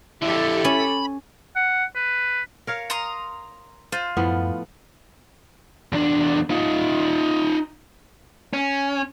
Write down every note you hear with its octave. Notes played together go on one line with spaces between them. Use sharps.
F2 D3 E4 G4 A4
C#4 B5
F#5
B4
A#4 C#5 F5
A#5 C6 D#6
F4 C5
F#2 A2 F3 B3
E2 D4
D#4 F4
C#4